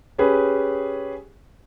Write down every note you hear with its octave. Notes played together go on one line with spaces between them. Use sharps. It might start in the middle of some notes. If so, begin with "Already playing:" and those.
C#4 G4 G#4 B4